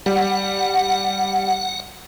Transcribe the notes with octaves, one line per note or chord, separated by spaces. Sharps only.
G3 F#5